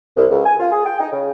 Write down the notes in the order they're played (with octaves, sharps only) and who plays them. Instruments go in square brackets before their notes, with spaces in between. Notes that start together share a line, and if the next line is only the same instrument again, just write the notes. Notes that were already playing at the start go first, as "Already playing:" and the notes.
[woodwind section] C2
C#2
G#5
F4
G#4
G5
D#4
C#3